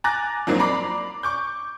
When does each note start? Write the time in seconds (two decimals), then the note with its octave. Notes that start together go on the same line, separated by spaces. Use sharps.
0.04 G#5 A#5 D6 F#6 A6 A#6
0.47 F2 G#2 F#3 A#3 C4 D4
0.60 D5 A#5 B5 D6 C7
1.23 C#6 D6 G6